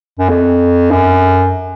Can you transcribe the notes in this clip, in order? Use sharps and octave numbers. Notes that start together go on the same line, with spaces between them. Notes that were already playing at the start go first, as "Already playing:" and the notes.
F#2
F2
F#2